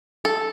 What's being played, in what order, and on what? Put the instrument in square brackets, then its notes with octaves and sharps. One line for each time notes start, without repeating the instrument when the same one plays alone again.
[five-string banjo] A4